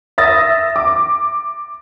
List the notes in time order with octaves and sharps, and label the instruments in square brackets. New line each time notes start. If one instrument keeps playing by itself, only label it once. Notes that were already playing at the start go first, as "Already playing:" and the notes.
[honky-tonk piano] E5 D#6 A6 A#6
D6